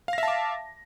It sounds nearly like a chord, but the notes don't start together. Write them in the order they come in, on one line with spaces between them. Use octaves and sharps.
F5 A#6 E5 A5 D6